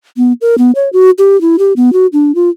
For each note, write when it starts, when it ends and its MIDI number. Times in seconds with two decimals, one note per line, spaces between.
0.17 0.33 59
0.41 0.55 70
0.58 0.71 59
0.75 0.89 73
0.93 1.10 66
1.18 1.39 67
1.41 1.56 64
1.59 1.73 67
1.76 1.93 59
1.93 2.07 66
2.13 2.35 62
2.35 2.50 65